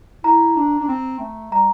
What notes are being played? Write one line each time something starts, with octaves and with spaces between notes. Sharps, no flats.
E4 A#5
D4
D4
C4
A3
G3 A#5